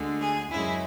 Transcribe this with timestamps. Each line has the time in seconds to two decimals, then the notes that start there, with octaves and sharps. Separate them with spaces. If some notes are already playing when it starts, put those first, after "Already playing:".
Already playing: D2 D3 G#3
0.21 G#4
0.50 F#2 C#3 G#3 E4